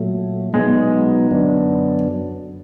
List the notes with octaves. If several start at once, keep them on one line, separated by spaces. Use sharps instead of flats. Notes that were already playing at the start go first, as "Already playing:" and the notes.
Already playing: A#2 F#3 A3
B2 F#3 G#3 B3 D#4
F#2 D3 F#3 B3 D4